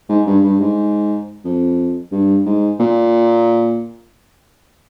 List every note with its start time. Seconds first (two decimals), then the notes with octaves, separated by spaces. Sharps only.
0.09 G#2
0.27 G2
0.44 G2
0.60 G#2
1.45 F2
2.12 G2
2.46 G#2
2.80 A#2